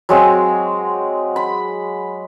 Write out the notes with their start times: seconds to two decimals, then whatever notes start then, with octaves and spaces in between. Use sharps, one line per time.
0.09 F#3 G#3 C4
1.36 B5